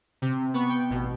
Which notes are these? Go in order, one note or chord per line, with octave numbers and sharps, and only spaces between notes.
C3
B3 C#6
G5
A1 B2